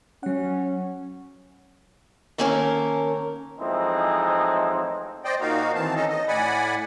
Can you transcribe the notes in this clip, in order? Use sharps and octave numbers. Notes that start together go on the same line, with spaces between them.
F#3 C#4 F#5
D#3 A#3 C#4 A4 A#4
A2 E3 F3 G#3 C4 D#4
C5 D5 D#5 G5
A#2 A#3 D#4 F#4 F5
D#3 E3 C4 A5
C#4 D#4 A4 D#5
D#5
A2 D5 F#5 G#5 B5